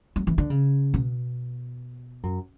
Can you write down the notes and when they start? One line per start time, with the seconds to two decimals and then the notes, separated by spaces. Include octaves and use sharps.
0.16 F#3
0.27 E3
0.38 D3
0.50 C#3
0.94 B2
2.23 F#2